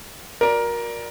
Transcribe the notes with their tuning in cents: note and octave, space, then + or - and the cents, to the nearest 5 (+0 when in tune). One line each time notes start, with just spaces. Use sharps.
F#4 -25 A#4 +15 D5 +0